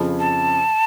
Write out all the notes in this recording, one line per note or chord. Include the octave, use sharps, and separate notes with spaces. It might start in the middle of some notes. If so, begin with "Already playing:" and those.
Already playing: F2 C#3 F3
A5